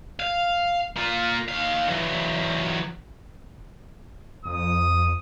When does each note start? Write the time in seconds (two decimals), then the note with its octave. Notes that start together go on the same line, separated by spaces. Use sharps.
0.20 F5
0.96 A#3 F4
1.48 D#2 F5
1.89 E3 F#3
4.45 F2 D#6